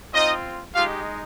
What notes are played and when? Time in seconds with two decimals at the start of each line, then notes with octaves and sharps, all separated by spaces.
0.14 C4 D#4 F4 D#5
0.74 G#3 D#4 F4 G4 F5